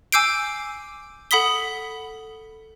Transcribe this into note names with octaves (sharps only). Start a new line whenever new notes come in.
G#5 D6 E6 G6 C7 D7
A4 F#5 B5 D#6 B6 G7